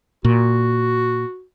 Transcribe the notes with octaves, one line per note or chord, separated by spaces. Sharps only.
A#2 F#4